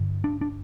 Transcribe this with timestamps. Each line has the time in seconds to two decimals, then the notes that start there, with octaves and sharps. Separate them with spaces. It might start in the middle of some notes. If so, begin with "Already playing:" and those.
Already playing: G2 D3
0.24 D4
0.41 D4